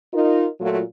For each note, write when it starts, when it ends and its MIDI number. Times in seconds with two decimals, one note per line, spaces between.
0.13 0.47 63
0.13 0.47 65
0.13 0.47 70
0.61 0.80 46
0.61 0.80 54
0.61 0.80 57
0.61 0.80 65